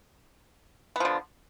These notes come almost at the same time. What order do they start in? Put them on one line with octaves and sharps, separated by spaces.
B3 F3 D3